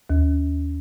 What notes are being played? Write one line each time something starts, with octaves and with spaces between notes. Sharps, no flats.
D#2